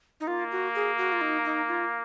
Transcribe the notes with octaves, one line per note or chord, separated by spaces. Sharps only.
D#4
A#3 F4
F#4
G#4
F#4
F4
D#4
D#4
F4